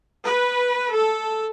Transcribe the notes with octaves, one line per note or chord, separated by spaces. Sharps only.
B4
A4